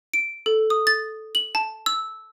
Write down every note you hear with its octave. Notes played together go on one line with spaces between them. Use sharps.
D7
A4
D#6
A6
F#7
A5
E6